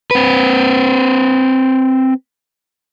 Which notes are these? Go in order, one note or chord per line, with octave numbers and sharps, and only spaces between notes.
C4 B4